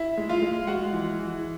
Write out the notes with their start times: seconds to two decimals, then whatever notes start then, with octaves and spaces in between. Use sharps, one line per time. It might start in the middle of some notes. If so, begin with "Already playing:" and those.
Already playing: E4 E5
0.17 G#3
0.29 F4 F5
0.42 G#3
0.67 G#3 F#4 F#5
0.93 E3
1.19 E3